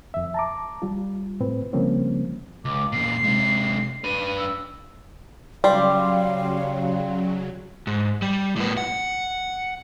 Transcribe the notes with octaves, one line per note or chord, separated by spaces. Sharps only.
F2 E5
A5 A#5 D6
G3 F4
A2 C4 B4
C#3 F3 G3 A#3 C4 C#4
C#2 D6
E2 A#2 C7
C3 G#3
D4 B4 D#7
E6
C#3 F#3 G3 D5 F5 G5 C6
G#2
G3
A2 B3
F#5